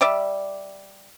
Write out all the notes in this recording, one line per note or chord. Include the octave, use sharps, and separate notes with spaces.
G3 D5 E5